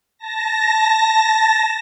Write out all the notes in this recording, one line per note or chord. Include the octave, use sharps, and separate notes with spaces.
A5 A#6